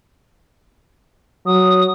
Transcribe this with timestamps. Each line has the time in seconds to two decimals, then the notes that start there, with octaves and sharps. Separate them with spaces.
1.46 F#3 D#6